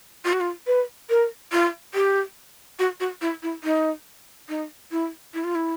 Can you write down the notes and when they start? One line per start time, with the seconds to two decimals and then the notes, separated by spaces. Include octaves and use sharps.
0.25 F4
0.33 F#4
0.41 F4
0.67 B4
1.10 A#4
1.52 F4
1.94 G4
2.79 F#4
3.00 F#4
3.21 E4
3.43 E4
3.64 D#4
4.49 D#4
4.91 E4
5.34 E4
5.44 F4
5.55 E4